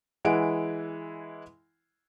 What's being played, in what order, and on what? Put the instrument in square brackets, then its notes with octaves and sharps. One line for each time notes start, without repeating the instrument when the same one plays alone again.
[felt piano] E3 G#3 E4 F#5 D7